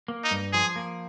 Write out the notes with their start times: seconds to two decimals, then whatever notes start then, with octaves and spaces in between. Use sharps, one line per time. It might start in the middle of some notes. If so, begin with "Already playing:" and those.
0.08 A#3
0.24 D#4
0.31 G2
0.53 F3 G#4
0.76 A#3